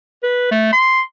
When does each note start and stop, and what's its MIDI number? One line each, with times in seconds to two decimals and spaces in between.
0.23 0.51 71
0.51 0.68 57
0.73 1.01 84